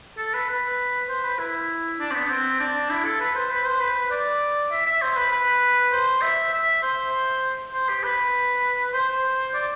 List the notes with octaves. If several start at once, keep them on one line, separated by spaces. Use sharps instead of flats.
A4
B4
B4
C5
B4
E4
D4
C4
B3
C4
D4
E4
A4
B4
C5
B4
C5
B4
D5
E5
E5
C5
B4
B4
C5
E5
E5
C5
C5
G4
B4
C5
D5